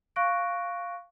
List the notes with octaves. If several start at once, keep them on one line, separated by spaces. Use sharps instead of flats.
F5 C#6 F#6 A#6 D7